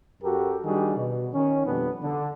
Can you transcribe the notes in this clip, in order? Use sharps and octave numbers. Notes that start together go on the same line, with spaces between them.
F#2 F#4 G4 A4 A#4
D#3 G3 D4 F#4 G#4
B2
D#3 C#4
F2 B2 G3 B3 D4
D3